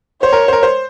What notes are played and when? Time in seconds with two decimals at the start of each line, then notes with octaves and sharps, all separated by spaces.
0.23 C5 C#5
0.33 A#4
0.48 C5
0.53 A#4
0.63 C5